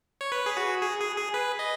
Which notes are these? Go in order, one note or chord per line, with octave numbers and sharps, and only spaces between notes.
C#5
B4
G#4
F#4
G#4
G#4
G#4
B4
D#5